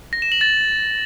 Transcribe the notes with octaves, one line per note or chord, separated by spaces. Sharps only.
A#6
E7
F#7
A6